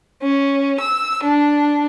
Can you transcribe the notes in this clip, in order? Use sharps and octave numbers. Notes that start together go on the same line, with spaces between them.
C#4
E6
D4